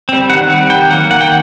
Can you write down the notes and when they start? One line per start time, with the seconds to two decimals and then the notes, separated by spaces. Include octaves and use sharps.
0.09 G3 C4
0.29 D#3 F#5
0.50 G3 C4
0.70 D#3 G5
0.90 F#3 A#3 F#5
1.10 D#3 F#5
1.21 G5